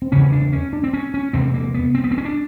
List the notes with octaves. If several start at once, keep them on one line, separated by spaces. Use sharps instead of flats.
C4
E2 C#3 C#4
D4
C#4
D4
C4
C#4
C#4
E2 C3 C4
A#3
B3
C4
B3
C4
C#4
D4